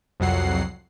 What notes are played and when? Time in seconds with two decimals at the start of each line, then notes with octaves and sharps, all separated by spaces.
0.20 C2 F2 F#3 F#5 C7